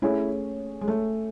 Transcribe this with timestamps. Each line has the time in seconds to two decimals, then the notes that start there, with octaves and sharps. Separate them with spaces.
0.02 A3 C#4 E4 G#4 C#5
0.81 G#3
0.88 A3